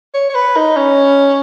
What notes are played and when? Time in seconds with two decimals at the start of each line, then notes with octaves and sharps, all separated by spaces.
0.14 C#5
0.29 C#5
0.35 B4
0.56 D#4
0.77 C#4